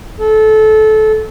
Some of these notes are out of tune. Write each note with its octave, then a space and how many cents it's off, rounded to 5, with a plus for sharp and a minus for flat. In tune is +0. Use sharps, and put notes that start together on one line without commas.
A4 -25